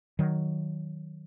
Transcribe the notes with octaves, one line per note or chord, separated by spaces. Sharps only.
D#3 F#3